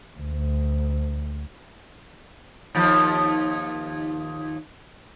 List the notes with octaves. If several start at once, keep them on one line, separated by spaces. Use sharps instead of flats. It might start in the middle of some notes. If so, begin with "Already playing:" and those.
D2
D#2 F3